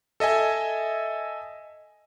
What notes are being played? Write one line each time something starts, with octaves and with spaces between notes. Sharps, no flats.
A4 D#5 E5 G#5